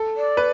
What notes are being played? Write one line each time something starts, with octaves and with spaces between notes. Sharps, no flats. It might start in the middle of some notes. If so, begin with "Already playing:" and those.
Already playing: A4
D5
B4